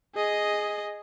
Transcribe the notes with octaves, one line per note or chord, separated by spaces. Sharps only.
G#4 D#5